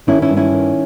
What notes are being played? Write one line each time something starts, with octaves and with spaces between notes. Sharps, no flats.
D#3 C#4 E4
C#4 E4
G2
C#4 E4
D#3